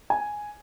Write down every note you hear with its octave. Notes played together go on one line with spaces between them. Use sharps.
G#5